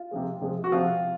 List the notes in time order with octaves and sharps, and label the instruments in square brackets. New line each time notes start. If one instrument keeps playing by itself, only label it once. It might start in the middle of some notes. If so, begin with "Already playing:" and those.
Already playing: [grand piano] F4
C3 F3 G#3
C3 F3 G#3
F#4
C3 F3 G#3 F4